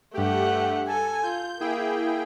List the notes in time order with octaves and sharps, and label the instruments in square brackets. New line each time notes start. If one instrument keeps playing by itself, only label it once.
[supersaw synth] G2 G4 [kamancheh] A3 F#5
[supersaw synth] A4 [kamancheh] G#5
[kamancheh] F4 [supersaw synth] G6
[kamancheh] A#3 [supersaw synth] E4 G#4 G5